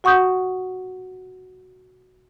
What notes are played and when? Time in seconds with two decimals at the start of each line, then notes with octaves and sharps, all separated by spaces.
0.04 F#4 F#5 C#6 D#6 G6